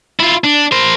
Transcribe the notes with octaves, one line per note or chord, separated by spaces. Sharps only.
E4 F4
D4
A#4 C5